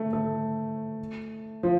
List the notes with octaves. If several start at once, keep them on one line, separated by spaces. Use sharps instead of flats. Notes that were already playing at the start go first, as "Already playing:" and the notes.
Already playing: A3
A3
F3